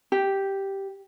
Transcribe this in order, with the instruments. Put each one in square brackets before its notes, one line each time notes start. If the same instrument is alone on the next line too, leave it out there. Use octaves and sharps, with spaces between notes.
[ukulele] G4